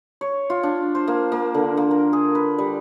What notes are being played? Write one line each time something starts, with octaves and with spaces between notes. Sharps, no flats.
C#5
F4
D4
C5
A#3
A#3
D3
A#3
A#4
G#4
B4
G3